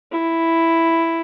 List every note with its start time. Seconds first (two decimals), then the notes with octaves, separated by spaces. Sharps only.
0.12 E4